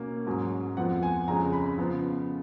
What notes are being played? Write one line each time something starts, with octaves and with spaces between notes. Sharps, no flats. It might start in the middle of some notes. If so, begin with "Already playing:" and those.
Already playing: B2 A#3 C#4
G#2 F#3 C#4
F2 F3 B3 F#5
G#5
F2 C#3 G#3 C#4 A#5
B5
C#3 F3 B3